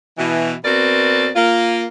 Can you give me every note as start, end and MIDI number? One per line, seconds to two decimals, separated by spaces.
0.18 0.54 47
0.18 0.54 52
0.64 1.29 47
0.64 1.29 60
0.64 1.29 66
0.64 1.29 70
0.64 1.29 71
0.64 1.29 74
1.35 1.85 58
1.35 1.85 65